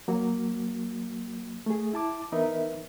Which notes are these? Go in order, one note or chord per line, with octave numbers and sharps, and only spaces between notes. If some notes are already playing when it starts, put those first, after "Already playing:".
F#3 A#3 F#4
A3 G#4
E4 A5 D6
E3 B3 D#4 A#4 B4 E5